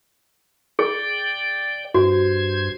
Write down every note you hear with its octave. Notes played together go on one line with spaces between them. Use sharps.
G#4 D5 G5
G2 F#4 C5 G#6